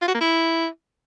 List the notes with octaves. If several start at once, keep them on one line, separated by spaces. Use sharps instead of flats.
F4
F#4
A#3
E4